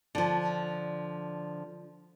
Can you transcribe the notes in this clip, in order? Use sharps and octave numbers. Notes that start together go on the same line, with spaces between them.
D3 F3